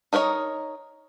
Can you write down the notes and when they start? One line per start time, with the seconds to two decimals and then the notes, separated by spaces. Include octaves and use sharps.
0.13 D#4 A#4 B4 C#5 D#5